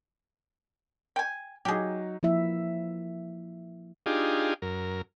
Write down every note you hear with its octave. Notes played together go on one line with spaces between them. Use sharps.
G5 G#5
F#3 D#4 G4 G#4
F3 A#3 E4 E5
D4 D#4 F4 G4 G#4
F#2 A#4